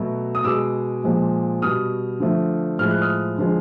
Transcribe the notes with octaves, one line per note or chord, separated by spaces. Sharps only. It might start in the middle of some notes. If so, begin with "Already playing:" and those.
Already playing: B2 F#3 A3
D#6
B2 G#3 D6 E6
A#2 F3 G#3
B2 G3 D#6 F6
D3 F3 A3
A2 F3 G#3 F6
F#6
D#6 F6
D3 F3 G#3